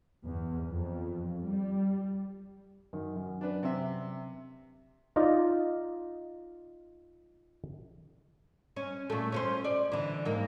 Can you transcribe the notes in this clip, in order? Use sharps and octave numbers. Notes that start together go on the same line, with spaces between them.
E2
F2
G3
F#2 D#3
F#2
D4 B4
C3 E5
D#4 F4 D5 D#5
C#4
A#2 A3
C#4 A#4 C5
D5
D3 E3
G#2 A#3